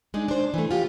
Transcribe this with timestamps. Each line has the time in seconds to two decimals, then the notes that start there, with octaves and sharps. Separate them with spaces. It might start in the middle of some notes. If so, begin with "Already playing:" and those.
0.14 G#3 D4 D#4
0.28 D4 C5
0.54 E3 A3
0.71 F4 G4